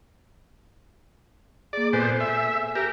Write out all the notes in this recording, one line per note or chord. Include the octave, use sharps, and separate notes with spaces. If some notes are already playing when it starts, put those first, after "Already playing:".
A#3 G#4 D5
A#2 B3 A4 C5 G#5
E5
G4 A#4